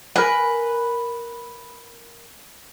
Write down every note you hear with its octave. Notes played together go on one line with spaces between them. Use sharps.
A#4 B4 G#5